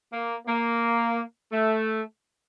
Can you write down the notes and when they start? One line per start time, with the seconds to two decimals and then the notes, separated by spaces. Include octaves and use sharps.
0.11 A#3
0.46 A#3
1.51 A3